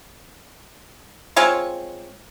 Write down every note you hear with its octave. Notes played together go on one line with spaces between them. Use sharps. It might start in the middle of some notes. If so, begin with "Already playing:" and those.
G#3 C4 F4 C#5